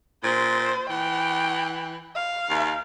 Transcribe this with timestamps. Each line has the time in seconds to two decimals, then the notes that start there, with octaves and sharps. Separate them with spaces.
0.23 A#2 C5
0.89 E3 G5
2.15 F5
2.50 D#2